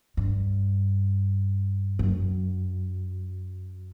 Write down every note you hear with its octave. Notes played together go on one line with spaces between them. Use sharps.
G2
F#2